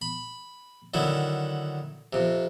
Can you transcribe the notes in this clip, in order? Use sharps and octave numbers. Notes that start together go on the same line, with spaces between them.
B5
D3 D#3 F#3 E4
F2 C3